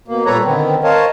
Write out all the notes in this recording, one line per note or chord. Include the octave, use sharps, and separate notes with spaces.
B2 A#3
A#2 G3 A4 B4 C#5 A#5
D3 D#3 B3 C4
A#4 C5 C#5 D#5 F5 A5